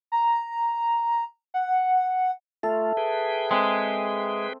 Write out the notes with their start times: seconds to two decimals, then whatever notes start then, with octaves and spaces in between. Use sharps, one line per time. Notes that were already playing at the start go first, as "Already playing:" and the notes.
0.12 A#5
1.54 F#5
2.63 A3 F4 A4 E5
2.97 G#4 B4 G5
3.51 G#3 C4